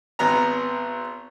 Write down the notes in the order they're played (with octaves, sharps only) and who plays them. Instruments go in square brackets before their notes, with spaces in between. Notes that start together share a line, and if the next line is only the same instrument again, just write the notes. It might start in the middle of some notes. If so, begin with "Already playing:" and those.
[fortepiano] G#1 B3 A#5